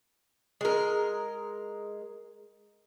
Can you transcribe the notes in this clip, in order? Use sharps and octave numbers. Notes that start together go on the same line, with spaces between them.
G#3 A#4